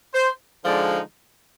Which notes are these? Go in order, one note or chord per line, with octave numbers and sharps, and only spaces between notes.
C5
D3 F3 G#3 D#4 D5